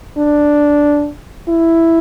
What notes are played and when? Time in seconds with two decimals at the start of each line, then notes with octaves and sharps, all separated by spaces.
0.18 D4
1.49 E4